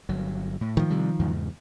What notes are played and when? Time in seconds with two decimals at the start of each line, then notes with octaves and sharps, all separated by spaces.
0.09 G1 F#3
0.61 A2
0.77 D#3 F3
0.90 C3 G3
1.19 E2 G#2 C#3